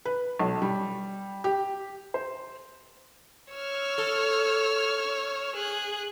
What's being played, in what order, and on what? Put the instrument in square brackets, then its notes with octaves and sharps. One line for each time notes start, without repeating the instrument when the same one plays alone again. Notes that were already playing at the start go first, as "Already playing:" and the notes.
[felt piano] B4
B1
G3
G4
C5
[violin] C#5 [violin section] E6 F6
[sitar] A4
[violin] G#4 F#6